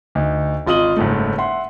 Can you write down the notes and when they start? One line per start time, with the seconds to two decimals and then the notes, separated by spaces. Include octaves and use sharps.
0.15 D2 D#4
0.67 G#1 F4 D#5 D#6 F#7 G7
0.96 F#1 G#2 A3
1.38 E5 F#5 C6